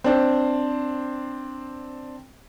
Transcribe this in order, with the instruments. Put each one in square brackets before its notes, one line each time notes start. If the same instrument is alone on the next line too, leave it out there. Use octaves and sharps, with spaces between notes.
[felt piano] C4 D4 C5